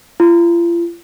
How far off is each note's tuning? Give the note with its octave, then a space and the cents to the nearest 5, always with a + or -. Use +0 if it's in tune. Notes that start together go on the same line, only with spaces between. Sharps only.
F4 -40